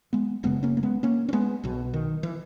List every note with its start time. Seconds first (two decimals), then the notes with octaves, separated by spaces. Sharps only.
0.13 G#3 B3
0.43 F#1 F#2 C#3 G#3 B3
0.63 A#3 C#4
0.77 A#3
0.83 G#3 B3
1.03 A#3 C#4
1.29 C#4
1.33 G#3 B3
1.64 B1 B2
1.94 D#3
2.23 E3